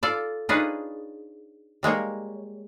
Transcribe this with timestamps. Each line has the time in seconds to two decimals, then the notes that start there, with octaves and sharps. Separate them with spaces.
0.03 F4 A4 D5
0.49 D4 D#4 F4 G#4 B4 C#5
1.83 G3 G#3 A#3 C#5